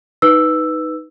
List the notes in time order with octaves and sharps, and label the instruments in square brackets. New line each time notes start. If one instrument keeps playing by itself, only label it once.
[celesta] D#4 B4 E6